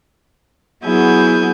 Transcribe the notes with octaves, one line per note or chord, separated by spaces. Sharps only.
F#3 B3 E4 G#4 G#5 G6